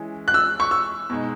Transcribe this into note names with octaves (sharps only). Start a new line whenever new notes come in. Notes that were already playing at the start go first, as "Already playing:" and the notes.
Already playing: E3 G#3 C#4
F#6
E6
C#6
E6
B2 G#3 D#4